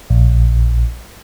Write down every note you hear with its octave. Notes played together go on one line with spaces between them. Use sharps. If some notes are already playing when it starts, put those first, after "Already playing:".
A#1